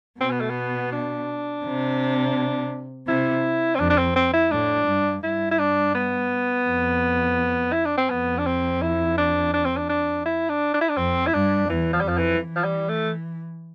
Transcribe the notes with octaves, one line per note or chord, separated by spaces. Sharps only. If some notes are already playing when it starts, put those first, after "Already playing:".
B2 C4
B3
A3
B3
D4
C3
C3 E4
C4
F2 D4
D4
C4
C4
E4
A2 D4
G2
G2 E4
E4
D4
B3
F2
E4
D4
C4
F2 B3
D4
C4
E4
D4
D4
C4
D4
D4
E4
D4
D4
E4
D4
F2 C4
E4
G2 D4
E2 E3
F3
G3
F2 F3
E3
E3
F3
G3
A3